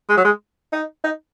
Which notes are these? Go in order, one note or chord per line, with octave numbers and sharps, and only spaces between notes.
G#3
F#3
G#3
D#4
D#4